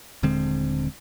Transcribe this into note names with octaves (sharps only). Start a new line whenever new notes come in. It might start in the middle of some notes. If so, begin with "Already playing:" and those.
D#1 D3 G#3 C4